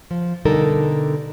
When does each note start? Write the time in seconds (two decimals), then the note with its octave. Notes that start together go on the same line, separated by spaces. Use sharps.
0.11 F3
0.45 B2 D3 G3 D#4 A4 A#4